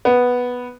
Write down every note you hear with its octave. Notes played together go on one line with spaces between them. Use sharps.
B3